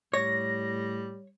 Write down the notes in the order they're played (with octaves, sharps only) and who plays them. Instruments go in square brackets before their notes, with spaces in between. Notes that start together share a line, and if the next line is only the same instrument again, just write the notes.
[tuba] A2 [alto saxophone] G3 [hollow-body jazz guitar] C#5 [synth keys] A#6